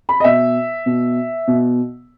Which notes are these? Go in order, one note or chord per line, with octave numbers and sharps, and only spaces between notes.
B5
D#5
B2 E5
B2
B2